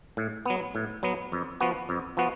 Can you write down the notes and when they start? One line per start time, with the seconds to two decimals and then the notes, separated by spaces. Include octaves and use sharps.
0.17 A2
0.46 F#3 B3
0.75 A2
1.03 F#3 B3
1.32 F2
1.60 F3 B3 F#4
1.89 F2
2.17 F3 B3 F#4